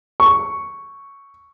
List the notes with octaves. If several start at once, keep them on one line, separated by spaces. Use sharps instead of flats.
C#6